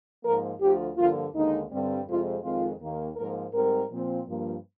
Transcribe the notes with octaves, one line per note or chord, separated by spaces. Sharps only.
G#2 F3 A#3 A#4
D2 D3 F3 G4
G2 D3 F3 A#3 F4
D#2 D3 G#3 D#4
G2 D3 G3 C4
F2 C3 F3 G#3 C4 F4
F2 D#3 G#3 C4 F4
D#2 D#3 A#3
G#2 F3 A#3 A#4
G#2 G3 C4 A#4
A#2 F3 C4
G2 F3 A#3